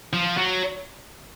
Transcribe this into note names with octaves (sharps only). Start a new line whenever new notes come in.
F3
F#3